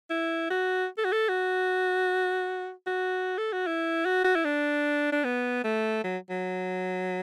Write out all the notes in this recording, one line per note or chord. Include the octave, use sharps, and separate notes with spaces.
E4
F#4
A4
F#4
A4
F#4
F#4
A4
F#4
E4
F#4
F#4
E4
D4
D4
B3
A3
F#3
F#3